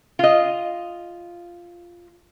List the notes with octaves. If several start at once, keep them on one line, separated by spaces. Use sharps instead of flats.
F4 D#5